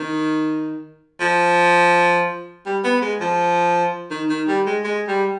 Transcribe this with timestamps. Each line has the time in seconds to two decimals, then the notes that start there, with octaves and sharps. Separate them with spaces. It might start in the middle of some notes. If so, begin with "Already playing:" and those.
Already playing: D#3
1.20 F3
2.66 G3
2.84 B3
3.02 G#3
3.21 F3
4.11 D#3
4.29 D#3
4.48 G3
4.66 G#3
4.84 G#3
5.08 G3